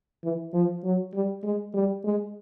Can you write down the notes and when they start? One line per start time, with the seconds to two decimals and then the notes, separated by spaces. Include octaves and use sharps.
0.24 E3
0.54 F3
0.84 F#3
1.14 G3
1.44 G#3
1.74 G3
2.04 G#3